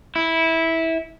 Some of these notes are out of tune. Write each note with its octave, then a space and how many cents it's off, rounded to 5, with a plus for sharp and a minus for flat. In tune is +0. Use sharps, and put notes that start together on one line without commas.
E4 -15